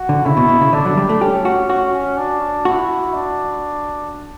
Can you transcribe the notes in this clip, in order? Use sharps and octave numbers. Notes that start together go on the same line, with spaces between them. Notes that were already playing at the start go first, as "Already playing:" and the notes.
Already playing: F#4
D3
C#3 E4
B2
B2
C#3
D3 D4
F#3
G3
A3
C#4 G4
F#4
F#4
D4
E4 F#4
D4